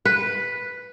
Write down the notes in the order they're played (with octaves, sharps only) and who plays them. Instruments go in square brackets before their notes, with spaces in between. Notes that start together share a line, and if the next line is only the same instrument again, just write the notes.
[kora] B4